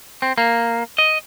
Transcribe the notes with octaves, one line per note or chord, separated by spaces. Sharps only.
C4
A#3
D#5